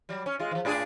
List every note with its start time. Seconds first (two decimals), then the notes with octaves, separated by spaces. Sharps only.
0.09 F#3 G3
0.26 C#4
0.39 G#3 F4
0.51 E3 F3
0.65 A2 D4 G#4